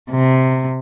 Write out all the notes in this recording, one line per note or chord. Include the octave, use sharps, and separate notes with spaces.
C3